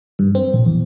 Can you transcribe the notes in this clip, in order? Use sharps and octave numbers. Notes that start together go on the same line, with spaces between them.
G2
C4
A#1
E2